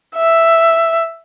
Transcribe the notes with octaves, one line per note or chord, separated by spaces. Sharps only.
E5